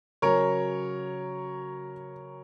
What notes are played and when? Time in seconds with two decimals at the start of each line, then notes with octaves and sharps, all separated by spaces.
0.22 C#3 F#3 A#4 C#5